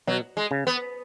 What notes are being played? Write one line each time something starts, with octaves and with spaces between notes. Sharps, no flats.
B2 F#3
G#3
C#3
B3